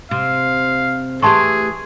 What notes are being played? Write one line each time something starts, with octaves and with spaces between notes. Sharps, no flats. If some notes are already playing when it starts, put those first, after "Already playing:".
C3 F5
E3 A3 G4 G#4 A5 C6 C#6